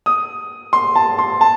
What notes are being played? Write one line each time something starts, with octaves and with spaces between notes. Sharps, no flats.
D#6
C6
A5
C6
A5